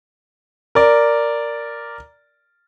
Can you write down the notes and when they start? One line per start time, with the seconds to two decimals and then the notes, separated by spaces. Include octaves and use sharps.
0.75 A#4 D5